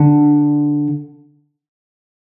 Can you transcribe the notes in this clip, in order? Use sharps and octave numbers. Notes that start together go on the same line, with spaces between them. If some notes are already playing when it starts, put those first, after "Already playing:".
Already playing: D3